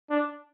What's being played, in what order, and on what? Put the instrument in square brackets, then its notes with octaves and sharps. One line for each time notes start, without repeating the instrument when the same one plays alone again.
[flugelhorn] D4